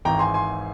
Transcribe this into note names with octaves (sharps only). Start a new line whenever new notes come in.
G#1 G#2 E3 G5 A#5
G#5 C6
G#5 C6